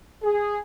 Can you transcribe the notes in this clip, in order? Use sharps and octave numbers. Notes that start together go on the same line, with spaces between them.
G#4